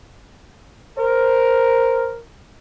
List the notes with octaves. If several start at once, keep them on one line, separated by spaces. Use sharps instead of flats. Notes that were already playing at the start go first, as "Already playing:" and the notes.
A#4 C5